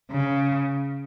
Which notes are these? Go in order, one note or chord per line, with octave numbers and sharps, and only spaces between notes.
C#3